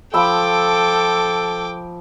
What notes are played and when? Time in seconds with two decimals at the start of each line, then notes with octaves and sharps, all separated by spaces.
0.14 F3 A4 G5 B5 D6 E6